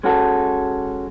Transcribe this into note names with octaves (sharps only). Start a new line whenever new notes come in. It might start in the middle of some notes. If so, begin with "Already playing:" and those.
G#3 C#4 F#4 A4